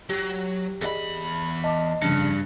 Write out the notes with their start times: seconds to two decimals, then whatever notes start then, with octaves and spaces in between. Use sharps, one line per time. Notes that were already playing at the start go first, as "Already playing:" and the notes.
0.10 F#3 G4
0.81 E2 G#4 D5 D#5 B5
1.64 D#5 A5 D6
2.02 F1 G2 C#3 D4 A5 A#6 C#7